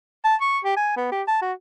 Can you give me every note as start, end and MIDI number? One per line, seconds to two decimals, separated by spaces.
0.24 0.35 81
0.41 0.59 85
0.64 0.76 67
0.77 0.93 80
0.97 1.10 59
1.12 1.23 67
1.28 1.40 81
1.42 1.53 66